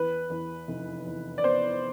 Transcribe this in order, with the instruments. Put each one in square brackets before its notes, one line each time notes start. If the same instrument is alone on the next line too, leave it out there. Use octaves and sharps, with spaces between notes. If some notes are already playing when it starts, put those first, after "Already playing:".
Already playing: [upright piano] E2 B4
E2
F1
E2
D5
B3 C5